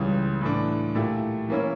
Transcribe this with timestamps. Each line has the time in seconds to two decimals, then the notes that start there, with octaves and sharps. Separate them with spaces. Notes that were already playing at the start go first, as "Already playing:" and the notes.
Already playing: C#2 C#3 E3 G3
0.41 A2 E3 A3 D4
0.95 A#2 A3 E4 G4
1.49 E3 A#3 C#4 E4